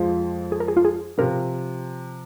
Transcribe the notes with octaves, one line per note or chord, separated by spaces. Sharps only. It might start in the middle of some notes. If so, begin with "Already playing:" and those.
Already playing: F2 F3 G#3
G#4
A#4
G#4
F4
G#4
C3 F3 A#4